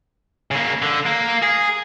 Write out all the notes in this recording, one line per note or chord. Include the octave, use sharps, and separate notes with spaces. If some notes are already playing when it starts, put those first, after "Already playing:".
C#3 A#3
D3
A#3
G#4